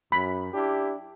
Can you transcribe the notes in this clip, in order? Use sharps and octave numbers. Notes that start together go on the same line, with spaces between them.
F#2 B5
D4 E4 G4